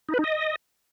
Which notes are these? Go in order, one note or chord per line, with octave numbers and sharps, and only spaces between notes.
D#4
B4
D#4
D#5